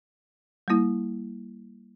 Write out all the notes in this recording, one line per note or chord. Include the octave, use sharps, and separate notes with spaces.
G3 A#3 E4